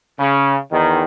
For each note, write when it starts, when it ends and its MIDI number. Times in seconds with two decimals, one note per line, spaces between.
0.20 0.56 49
0.72 1.05 40
0.72 1.05 51